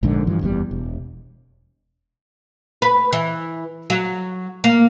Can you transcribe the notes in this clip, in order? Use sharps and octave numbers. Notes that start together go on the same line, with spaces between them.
A#1 G#2 D3
G2 E3 F3
F#1 E2 C3 G3
E1
B4
E3
F#3
A#3